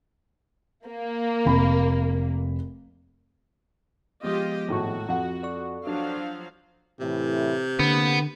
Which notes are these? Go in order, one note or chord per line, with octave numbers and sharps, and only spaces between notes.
A#3
F1 B5
F3 G#3 B3 F4 G4 D#5
G#1 A2 F#4 C#6
F2 F#5
A4 D5 C#6
F3 F#3 D4 F5
A2 C3 E3 E4
D3 A#3 B3